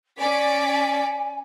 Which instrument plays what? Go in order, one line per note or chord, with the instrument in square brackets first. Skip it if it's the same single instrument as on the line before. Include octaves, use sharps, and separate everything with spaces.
[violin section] C#4 D5 B6 [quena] G#5